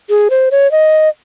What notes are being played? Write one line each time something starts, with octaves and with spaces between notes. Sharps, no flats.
G#4
C5
C#5
D#5